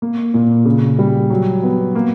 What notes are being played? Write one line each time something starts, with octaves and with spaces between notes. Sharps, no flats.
A#3
A#2
C#3
G3
F#3
B3
A#3